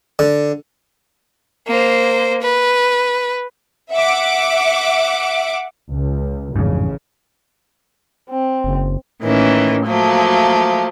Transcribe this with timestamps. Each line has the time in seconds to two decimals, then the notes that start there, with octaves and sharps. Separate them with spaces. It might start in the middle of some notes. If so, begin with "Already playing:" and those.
0.19 D3
1.67 A#3 C5
2.42 B4
3.92 E5 F#5 D6
5.90 C#2
6.56 A1 F2 G#2 C#3
8.30 C4
8.64 F#1
9.22 A2 D#3 E3 A#3 C#4
9.86 F3 F#3 A3 A#3